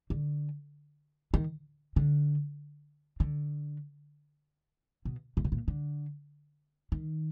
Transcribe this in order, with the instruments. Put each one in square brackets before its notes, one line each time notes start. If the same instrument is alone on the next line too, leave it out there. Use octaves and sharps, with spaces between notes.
[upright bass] D3
D#3
D3
D3
B2
A#2
B2
A#2
D3
D#3